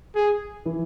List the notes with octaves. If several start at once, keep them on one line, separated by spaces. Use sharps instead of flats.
G#4
E3